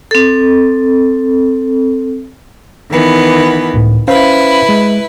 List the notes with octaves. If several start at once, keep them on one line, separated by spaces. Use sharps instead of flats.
C4 A4
D#3 E3 B3
C#2 A2
C#4 E4 B4 C5 F5
G#3